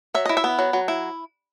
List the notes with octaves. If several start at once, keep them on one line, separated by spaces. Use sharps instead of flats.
F#3 E5
E4 D#5
E5
B3
F#3
F#3
E4